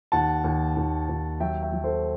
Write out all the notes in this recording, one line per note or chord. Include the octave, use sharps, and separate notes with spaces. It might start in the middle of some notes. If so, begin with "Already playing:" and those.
D#2 F#5 A5
D#2
D#2
D#2
F#3 E5 G5
E5 G5
F#3
A4 C5